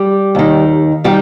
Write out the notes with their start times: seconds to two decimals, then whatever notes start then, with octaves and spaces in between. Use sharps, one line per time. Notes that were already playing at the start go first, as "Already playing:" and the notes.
Already playing: G3 G4
0.35 D#2 D#3
1.04 D#3 G3 G4